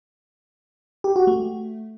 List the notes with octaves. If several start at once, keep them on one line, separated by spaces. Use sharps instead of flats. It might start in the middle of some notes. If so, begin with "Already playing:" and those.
G4
F#4
A3